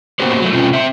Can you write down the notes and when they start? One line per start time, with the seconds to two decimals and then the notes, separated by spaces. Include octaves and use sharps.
0.20 A#3 B3 F#4 G4 C5
0.40 F#3 A3
0.53 B2 G3 A3 C4 C#4 F4
0.73 C4 E5